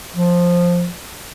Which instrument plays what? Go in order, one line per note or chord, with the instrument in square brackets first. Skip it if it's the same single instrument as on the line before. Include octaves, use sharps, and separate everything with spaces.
[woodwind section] F3